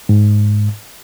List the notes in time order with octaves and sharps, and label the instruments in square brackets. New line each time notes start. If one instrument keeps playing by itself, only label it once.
[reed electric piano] G#2